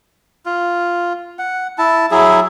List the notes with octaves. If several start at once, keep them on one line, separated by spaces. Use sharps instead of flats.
F4
F#5
E4 A5
F#3 E4 G#4 E5